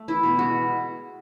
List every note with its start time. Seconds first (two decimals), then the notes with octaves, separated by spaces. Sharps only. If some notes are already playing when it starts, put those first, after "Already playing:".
Already playing: A3
0.08 E3 E4
0.23 B2
0.39 G#3 F#4